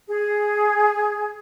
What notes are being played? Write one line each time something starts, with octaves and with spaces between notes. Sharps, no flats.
G#4